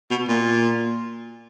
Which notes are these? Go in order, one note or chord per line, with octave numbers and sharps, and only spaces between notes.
B2
A#2